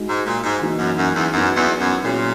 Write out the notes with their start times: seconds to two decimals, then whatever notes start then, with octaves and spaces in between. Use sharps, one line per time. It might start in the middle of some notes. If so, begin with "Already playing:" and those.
Already playing: G#3 D#4 F#4
0.08 G#2
0.26 A#2
0.44 G#2
0.62 E3 A#3 D#4 F#4
0.79 F#2
0.97 F#2
1.15 E2
1.33 F#2 F#3 B3 D#4
1.56 E2
1.80 F#2
2.03 A#2 F#3 C#4 E4 G#4